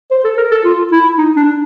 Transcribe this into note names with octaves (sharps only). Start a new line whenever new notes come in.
C5
A4
A#4
A4
F4
E4
D#4
D4